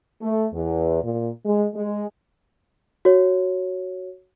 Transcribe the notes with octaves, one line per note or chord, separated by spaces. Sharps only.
A3
E2
A#2
G#3
G#3
F#4 C#5